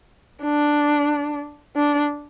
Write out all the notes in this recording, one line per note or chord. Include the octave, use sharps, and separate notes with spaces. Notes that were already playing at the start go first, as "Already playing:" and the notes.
D4
D4